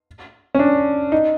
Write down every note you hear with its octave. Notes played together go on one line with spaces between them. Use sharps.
C#4
D4
D#4